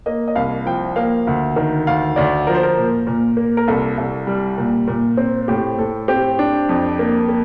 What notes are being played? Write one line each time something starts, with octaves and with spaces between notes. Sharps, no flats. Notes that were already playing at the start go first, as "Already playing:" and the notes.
A#3 D#5
D#5
C2 F5
F3 G5
A#3 F5
D2
D#3
D2 F5
D2 D5
F3 A#4
C5
A#4
A#2
A#2
A#3
A#4
C2 A4
C2
G3
A#2
A#2
C4
A2 G4
A2 A4
C4 G4
D4
F2
A#3
A#3